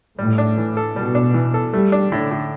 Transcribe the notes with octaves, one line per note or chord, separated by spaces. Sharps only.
A2 G3
D4
E3
A4
B2 G3
D4
E3
A4
G3 A3
D4
A2 D3
A2